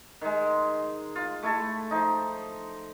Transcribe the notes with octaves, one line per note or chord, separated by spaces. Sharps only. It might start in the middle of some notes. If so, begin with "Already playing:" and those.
D#3 G#3
F4
A3 E4 A4
F3 D#4